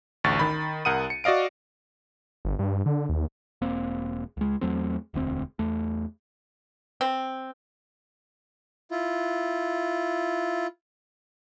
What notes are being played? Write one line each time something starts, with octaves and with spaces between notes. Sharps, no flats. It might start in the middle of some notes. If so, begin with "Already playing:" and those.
A1 D2 C#6 A6
D#3 B5
C2 A#4 F#5 D#6 D#7
C#7
F#4 D5 D#5 F5 D7
G1
G2
D3
D#2
E1 A#3 C4
C#2 G#3
E2 F#3 A3 C4
E1 D2 C4
E2 A3
C4
E4 F4